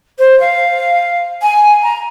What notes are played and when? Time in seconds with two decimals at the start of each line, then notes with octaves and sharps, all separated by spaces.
0.18 C5
0.39 F5
1.41 G#5
1.83 A#5